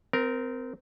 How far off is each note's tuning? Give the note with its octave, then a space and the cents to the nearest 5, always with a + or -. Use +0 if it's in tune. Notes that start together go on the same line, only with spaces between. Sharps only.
C4 -25 A#4 +0